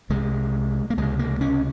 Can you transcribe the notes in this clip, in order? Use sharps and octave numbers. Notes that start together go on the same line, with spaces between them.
C2 C3 G#3
A#3
C#2 C3 G#3
A#3
C#4